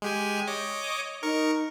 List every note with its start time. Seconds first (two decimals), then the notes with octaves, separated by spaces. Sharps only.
0.02 G#3 G4 G#5
0.47 C#5 D#5 D6
1.23 D#4 A#4 C#6